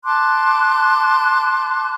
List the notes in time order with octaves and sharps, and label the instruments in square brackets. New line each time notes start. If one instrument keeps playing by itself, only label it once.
[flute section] A5 C6 D6 F#6